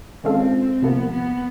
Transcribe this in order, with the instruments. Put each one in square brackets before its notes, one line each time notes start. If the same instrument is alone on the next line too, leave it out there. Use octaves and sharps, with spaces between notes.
[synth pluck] D#3 G#3 C#4 F4 A4 [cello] C4
[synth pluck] D2 C3 F3 A#3 [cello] B3
[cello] B3